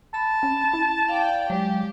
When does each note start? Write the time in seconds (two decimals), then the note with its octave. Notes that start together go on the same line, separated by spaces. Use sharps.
0.14 A5 B5
0.43 C#4
0.73 E4
1.09 D5 F5 G5
1.50 F#3 G#3 G4